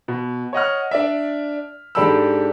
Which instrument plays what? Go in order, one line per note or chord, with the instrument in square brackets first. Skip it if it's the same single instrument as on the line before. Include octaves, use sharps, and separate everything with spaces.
[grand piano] B2
C#5 D#5 F#5 F6
D4 D5 E5
G#2 D4 G4 A4 B5 E6